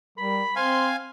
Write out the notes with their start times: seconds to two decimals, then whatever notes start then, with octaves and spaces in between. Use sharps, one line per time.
0.18 G3 A#4 B5
0.56 C4 C5 F5 G#5 C6